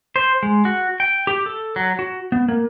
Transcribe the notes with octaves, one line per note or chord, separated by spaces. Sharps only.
C5
G#3
F#4
G5
G4
A4
F#3
F#4
B3
A#3